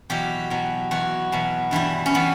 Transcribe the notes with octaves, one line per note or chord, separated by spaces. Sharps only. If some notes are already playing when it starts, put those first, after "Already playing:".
E2 B2 F#3 G4
E2 B2 F#3
E2 B2 F#3 F#4
E2 B2 F#3
G2 E3 G3 E4
C#4
E3 G3 B3